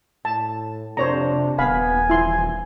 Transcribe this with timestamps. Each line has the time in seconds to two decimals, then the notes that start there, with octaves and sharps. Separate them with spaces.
0.25 A2 A5
0.97 F2 C3 D4 C5 C#5 A#5
1.59 D#1 B3 F5 G#5 B5
2.10 E3 F3 E4 C6